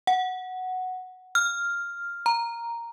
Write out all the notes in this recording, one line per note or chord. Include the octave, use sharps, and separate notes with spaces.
F#5
F6
A#5